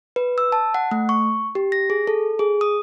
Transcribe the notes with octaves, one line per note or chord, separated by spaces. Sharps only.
B4
E6
A5
F#5
A3
C#6
G4
A#6
G#4
A4
G#4
D#6